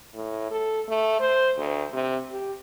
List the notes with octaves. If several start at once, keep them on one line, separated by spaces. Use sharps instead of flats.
A2
A4
A3
C5
D2
C3
G4